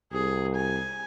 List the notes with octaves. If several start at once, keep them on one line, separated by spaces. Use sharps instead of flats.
C2 G#4
G#5